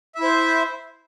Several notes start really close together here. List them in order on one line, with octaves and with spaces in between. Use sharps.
E5 E4 C5